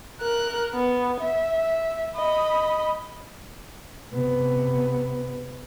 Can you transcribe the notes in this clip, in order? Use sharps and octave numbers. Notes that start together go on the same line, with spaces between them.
A#4 F#6
B3
E5
D#5 B5
C3 B3